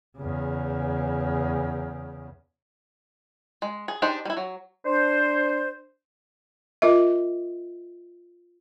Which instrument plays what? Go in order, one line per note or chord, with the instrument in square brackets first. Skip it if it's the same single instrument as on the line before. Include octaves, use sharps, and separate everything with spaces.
[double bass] E2 C#3
[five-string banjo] G#3
G#4
D4 D#4 G4 G#4 C5
G3 E4
F#3
[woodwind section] D4 C5
[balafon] F4 A#4 D#5 E5